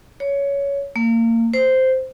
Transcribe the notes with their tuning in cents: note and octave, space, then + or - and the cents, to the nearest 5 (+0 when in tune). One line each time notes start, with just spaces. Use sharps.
C#5 +15
A#3 -30
C5 -5